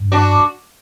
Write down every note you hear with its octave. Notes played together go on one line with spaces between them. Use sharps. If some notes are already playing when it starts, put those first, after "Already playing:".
Already playing: G2
D4 F#4